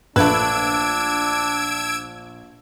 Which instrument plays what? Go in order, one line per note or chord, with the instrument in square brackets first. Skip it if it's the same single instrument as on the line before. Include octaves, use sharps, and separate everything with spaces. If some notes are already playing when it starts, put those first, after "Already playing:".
[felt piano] A#1 [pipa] A3 B4 [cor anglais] D4 [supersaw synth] E6 G#6 D7